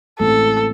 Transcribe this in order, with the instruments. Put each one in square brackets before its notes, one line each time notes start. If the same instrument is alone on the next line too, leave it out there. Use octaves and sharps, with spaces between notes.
[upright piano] A1 A2 G#3 C4 [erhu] A4